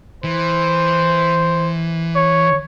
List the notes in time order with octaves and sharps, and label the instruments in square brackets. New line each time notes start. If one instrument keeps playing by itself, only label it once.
[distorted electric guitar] E3 [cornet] C5
[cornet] C#5